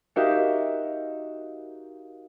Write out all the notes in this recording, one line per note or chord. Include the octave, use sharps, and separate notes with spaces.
D#4 F#4 G4 A#4 E5 F5